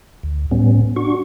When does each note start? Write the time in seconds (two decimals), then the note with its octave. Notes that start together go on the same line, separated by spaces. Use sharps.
0.23 D2
0.51 A2 G3 B3 C#4
0.96 D4 F#4 C#6